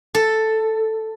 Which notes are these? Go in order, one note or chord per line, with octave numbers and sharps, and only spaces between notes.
A4